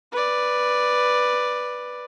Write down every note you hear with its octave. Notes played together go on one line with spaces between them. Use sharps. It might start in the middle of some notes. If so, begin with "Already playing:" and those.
B4 D5